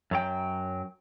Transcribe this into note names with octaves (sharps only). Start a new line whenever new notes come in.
F#2 F#3 G5